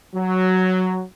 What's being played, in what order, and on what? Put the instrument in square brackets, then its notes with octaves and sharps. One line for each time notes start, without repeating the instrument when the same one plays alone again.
[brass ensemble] F#3